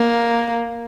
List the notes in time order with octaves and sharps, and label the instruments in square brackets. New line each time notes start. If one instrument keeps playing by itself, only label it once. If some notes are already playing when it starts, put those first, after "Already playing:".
Already playing: [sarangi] A#3